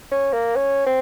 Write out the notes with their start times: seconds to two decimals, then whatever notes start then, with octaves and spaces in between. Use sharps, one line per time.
0.11 C#4
0.33 A#3
0.56 C#4
0.86 C4